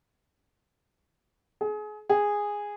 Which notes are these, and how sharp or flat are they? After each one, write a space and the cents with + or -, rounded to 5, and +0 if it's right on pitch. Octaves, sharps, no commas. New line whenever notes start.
G#4 +30
G#4 -10